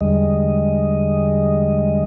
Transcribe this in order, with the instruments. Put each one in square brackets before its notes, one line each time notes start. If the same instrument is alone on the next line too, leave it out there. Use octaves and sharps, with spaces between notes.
[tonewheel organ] E2 D3 G3 G#3 D#5